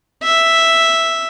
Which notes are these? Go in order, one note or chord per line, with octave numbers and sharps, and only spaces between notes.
E5